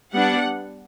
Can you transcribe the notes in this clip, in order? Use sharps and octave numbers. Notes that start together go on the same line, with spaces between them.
G3 B3 D4 F#5